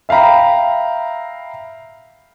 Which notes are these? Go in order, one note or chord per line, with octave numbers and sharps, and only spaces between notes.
E5 F5 G5 A#5 B5